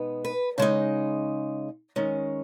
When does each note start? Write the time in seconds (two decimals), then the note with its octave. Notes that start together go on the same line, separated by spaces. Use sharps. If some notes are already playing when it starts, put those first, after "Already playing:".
Already playing: B2 G#3 B3 D#4
0.25 B4
0.58 C#3 G#3 D#4
1.96 D#3 G#3 C#4